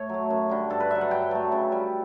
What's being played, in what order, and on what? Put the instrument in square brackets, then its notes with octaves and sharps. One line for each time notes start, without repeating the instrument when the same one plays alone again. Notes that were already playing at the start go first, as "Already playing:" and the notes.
Already playing: [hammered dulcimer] A2 C#5
F#3 A3
F#2
D3 G3
G2 A4
B4
D3 F#3 E5
F#5
G2 G5
F#3 A3
C#3
G3